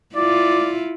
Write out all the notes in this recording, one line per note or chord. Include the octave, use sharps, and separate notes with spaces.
E4 F4 D5